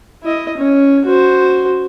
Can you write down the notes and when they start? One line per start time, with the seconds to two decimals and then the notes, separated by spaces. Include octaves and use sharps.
0.24 E4 D#5
0.57 C#4
1.06 F#4 C5